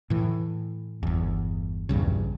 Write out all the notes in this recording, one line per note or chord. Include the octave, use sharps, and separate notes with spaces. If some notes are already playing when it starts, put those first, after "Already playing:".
A2 E3
G1 E2
A#1 E2 G2 C#3